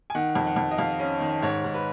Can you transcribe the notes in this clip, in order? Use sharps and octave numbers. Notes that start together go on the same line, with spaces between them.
G#5
D#3 F#5
F2
F#5
F2
D#5
F2 F5
C#4
D#3
G#2 C#5
G#2
B4